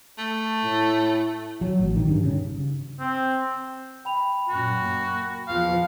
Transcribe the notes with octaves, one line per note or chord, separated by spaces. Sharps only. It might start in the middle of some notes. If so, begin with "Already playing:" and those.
A3
A2
F#3
A1
D#3
G2
C#3
C4
G5 B5 F7
F#2 A#2 F#4
A#3
E2 F3 F5